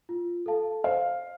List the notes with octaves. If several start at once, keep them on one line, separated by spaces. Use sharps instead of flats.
F4
A4 F5 A5
C5 F5